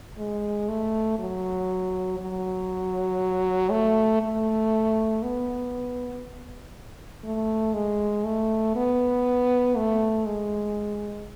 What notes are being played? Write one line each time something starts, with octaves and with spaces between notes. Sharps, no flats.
G#3
A3
F#3
F#3
A3
A3
B3
A3
G#3
A3
B3
A3
G#3